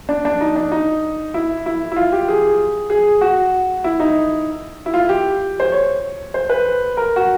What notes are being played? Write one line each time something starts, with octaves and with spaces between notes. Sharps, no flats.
D4
D4
D#4
D4
D#4
E4
E4
E4
F4
G4
G#4
G#4
F#4
E4
D#4
E4
F4
G4
C5
C#5
C5
B4
A#4
F#4